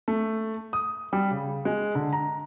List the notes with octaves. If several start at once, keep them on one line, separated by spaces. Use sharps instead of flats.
A3
D#6
G3
C#3
G#3
D3
A#5